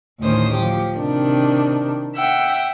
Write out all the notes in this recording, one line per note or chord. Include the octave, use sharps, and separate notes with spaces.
D2 A2 D#3 C#4 C5 D#6
F3 G4
C3 D#3 D4
E5 F#5 G5